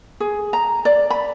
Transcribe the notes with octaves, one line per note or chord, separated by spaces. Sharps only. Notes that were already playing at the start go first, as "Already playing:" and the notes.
G#4
A#5
D5
B5